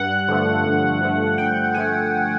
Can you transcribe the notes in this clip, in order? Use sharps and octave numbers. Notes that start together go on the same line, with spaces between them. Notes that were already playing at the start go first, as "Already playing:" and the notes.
Already playing: G2 F#5
D3 F3 A3
G2
D3 F3 A3
G2 G5
D3 F3 A3 G#5